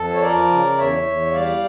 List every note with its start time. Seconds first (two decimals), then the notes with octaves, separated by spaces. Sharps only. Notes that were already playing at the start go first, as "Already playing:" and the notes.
Already playing: F2 A4
0.14 C#5
0.22 F3 A#4 D5
0.50 C#3
0.77 E2 C#5 E5
1.06 E2
1.33 G3 D5 F5